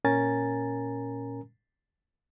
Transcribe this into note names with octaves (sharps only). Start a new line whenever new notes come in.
A#2 C#4 A#4 G#5 A#5 A6